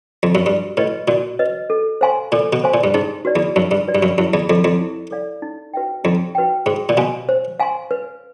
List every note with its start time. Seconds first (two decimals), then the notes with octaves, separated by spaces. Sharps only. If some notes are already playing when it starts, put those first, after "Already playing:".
0.23 F2
0.35 F#2
0.45 G2 F#4
0.77 A2 B4 D#5
1.08 A#2 F#4
1.39 B4 D#5
1.70 A4
2.01 C5 F5 G#5 C6
2.32 A#2 A4
2.53 B2
2.64 C5 F5 G#5 C6
2.74 A#2
2.84 G2
2.94 G#2 D#4
3.25 F#4 B4 D5
3.36 E2
3.56 F#2 D#4
3.71 G2
3.88 F#4 B4 D5
3.95 G2
4.03 F#2
4.18 F#2 E4
4.34 E2
4.49 F2 A4 D5 F5
4.64 F2
4.81 E4
5.11 A4 D5 F5
5.42 D#4
5.74 F#4 B4 E5 G5
6.04 F2 D#4
6.35 F#4 B4 E5 G5
6.66 G#2 C5
6.89 A#2
6.97 B2 F5 G#5 C6
7.29 C5
7.60 F5 G#5 C6
7.91 B4